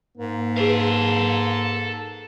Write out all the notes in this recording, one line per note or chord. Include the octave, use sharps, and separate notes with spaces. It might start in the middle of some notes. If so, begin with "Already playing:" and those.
G#2 A#3
G#4 A4 B4 F5